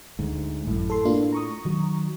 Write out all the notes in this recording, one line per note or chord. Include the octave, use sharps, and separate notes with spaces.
D2 G#2
G#1 F#2 A2
A4 C6
A#3 D4 F4
A#5 C#6 D#6
D#3 F#3